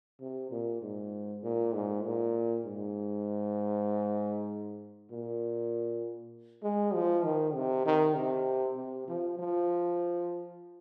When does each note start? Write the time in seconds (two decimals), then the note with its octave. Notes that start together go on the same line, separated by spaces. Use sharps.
0.20 C3
0.51 A#2
0.82 G#2
1.43 A#2
1.74 G#2
2.04 A#2
2.65 G#2
5.11 A#2
6.63 G#3
6.94 F3
7.24 D#3
7.55 C3
7.86 D#3
8.16 C3
8.77 C3
9.08 F3
9.39 F3